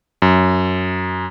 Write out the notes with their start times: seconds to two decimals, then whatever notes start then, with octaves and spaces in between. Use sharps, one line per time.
0.22 F#2